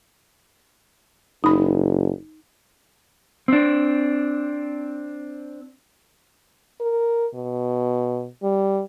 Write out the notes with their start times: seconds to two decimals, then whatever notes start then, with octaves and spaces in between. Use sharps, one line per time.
1.44 F#1 D#4 B5
3.48 C4 D4
6.81 A#4
7.35 B2
8.43 G3